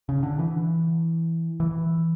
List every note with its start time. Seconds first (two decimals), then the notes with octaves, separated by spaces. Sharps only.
0.09 C#3
0.23 D3
0.39 E3
1.60 E3